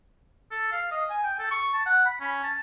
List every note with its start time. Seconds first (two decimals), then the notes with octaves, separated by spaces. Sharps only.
0.51 A4
0.72 F5
0.91 D#5
1.10 G#5
1.24 G5
1.39 A4
1.51 C#6
1.74 A5
1.86 F#5
2.05 B5
2.20 C#4
2.44 A5